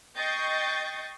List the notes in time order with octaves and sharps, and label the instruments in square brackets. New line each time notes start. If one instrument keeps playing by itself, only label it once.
[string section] D#5 G5 C#6 G6 A6 C7